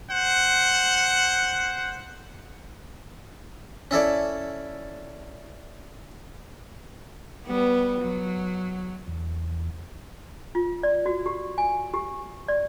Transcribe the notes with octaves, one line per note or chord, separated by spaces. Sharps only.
C5 F#5
C#4 E4 A4 D5
G3 B3
F#3
E2
F4
D5
F#4
G4
G#5
G4
D5